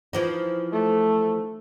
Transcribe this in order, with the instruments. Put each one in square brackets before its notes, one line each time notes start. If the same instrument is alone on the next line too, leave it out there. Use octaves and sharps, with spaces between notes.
[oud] E3 F3 D#4
[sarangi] A3